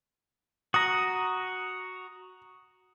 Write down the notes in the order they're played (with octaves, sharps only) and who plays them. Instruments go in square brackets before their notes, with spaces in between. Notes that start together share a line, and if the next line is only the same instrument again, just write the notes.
[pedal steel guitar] F#4 A#5 [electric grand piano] D#6